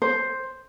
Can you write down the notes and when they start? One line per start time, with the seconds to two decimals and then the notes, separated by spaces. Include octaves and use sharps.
0.02 C5